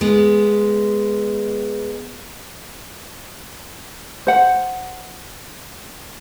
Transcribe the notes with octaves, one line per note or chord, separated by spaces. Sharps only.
G#3 B3
C5 F#5